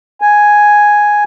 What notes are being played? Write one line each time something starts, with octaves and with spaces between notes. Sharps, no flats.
G#5